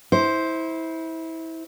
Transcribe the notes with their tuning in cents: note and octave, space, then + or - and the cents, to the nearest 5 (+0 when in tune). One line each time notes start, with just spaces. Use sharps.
E4 -25 C5 +0